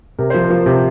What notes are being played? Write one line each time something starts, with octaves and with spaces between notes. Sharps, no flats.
C3 A#4
F3 C5
A#4
F3
C3